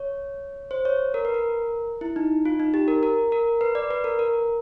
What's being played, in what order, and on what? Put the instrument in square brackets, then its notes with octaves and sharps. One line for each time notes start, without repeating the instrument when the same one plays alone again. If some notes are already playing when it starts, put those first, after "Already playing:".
Already playing: [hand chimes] C#5
C5
C#5
A#4
B4
A#4
E4
D#4
F4
D#4
G4
A#4
A#4
A#4
B4
D5
B4
A#4
A#4